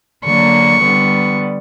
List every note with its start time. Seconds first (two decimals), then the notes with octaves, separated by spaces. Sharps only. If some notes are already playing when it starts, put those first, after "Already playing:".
0.24 D3 F#3 A#3 C#6
0.82 D3 G3 B3